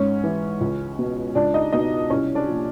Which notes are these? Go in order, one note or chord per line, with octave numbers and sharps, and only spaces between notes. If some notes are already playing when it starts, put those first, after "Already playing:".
Already playing: G#2 C#4 C#5
E3
C#2
B2
C#2 D4 D5
D#4 D#5
B2 D#4 D#5
C2 C#4 C#5
D4 D5
A#2 F3